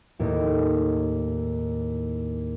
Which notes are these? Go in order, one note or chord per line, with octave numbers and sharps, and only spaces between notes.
D#2 A2